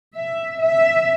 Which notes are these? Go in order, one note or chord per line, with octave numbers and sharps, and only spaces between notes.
E5
E5